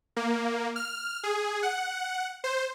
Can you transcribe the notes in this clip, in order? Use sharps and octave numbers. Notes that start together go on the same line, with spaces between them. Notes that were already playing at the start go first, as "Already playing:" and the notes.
A#3
F6
G#4
F#5
C5